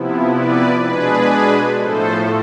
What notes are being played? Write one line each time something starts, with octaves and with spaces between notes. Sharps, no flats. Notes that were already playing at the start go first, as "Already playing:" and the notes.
Already playing: C3 F3 B3 E4
B4 D5
B2 G#3 D4 G#4 B4
A2 F3 A3 A4 C5